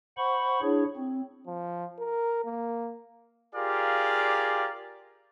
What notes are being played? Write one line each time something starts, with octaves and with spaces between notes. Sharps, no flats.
C5 F#5 B5 C#6
D4 E4 G#4 C#5
C4
F3
A#4
A#3
F4 G4 G#4 A#4 D5 F5